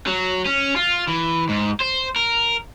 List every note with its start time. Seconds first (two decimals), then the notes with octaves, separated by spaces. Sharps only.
0.07 F#3
0.46 C#4
0.76 F4
1.07 E3
1.49 G#2
1.81 C5
2.16 A#4